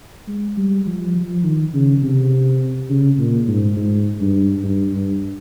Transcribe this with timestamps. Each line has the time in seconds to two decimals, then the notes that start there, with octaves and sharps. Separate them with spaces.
0.28 G#3
0.57 G3
0.86 F3
1.15 F3
1.44 D#3
1.74 C#3
2.02 C3
2.90 C#3
3.19 A#2
3.47 G#2
3.76 G#2
4.20 G2
4.64 G2
4.93 G2